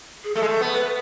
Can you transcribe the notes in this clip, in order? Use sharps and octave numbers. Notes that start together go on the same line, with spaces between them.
G#4
A3 A4
G#3
A3
B3
B4